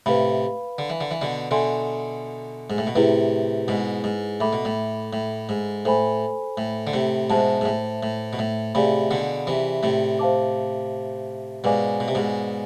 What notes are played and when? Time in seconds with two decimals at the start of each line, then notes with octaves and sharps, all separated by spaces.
0.06 A2 C3 B4 F5 B5
0.78 D3
0.90 E3
1.01 D3
1.11 E3
1.21 B2 D3
1.51 B2 D3 A4 E5 G#5 C6
2.70 G#2
2.78 A2
2.87 B2
2.95 A2 C3 E4 G#4 B4
3.68 G#2 B2
4.04 G#2
4.40 A2 A4 E5 B5 D6
4.53 B2
4.65 A2
5.13 A2
5.49 G#2
5.85 A2 A4 C5 G#5 B5
6.57 A2
6.87 D3
6.93 A2 C3
7.30 G#2 B2 C5 E5 A5
7.61 G#2
7.66 A2
8.03 A2
8.33 B2
8.39 A2
8.74 A2 C3 G#4 D5 F5 G#5 B5
9.11 B2 D3
9.47 C3 E3
9.83 A2 C3
10.19 C5 F5 A5 D6
11.64 G#2 B2 B4 D5 F5 G#5 D6
12.00 B2
12.08 C3
12.15 G#2 B2